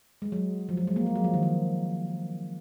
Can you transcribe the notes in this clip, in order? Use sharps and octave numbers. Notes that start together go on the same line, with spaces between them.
G#3
F#3
F3
F#3
G#3
A#3
G#3
F#3
F3
D#3
F3